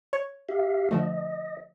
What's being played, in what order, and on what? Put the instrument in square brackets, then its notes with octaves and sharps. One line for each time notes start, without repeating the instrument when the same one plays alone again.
[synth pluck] C#5
[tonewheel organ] G4 E5 F5
[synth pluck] D3 F3 A3 [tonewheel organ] D#5